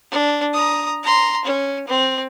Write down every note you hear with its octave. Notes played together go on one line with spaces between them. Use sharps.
D4
A#5 D#6
A#5 C6
C#4
C4